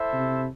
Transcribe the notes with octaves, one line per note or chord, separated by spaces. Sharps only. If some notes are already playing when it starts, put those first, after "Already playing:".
Already playing: E4 A4 C5 E5
C3